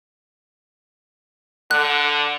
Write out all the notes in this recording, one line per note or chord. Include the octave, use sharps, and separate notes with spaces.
D3 F#6